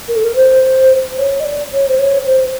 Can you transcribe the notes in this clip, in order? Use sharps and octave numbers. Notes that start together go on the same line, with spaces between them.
A#4
A4
A#4
C5
C#5
D#5
D5
C#5
C5
C#5
C5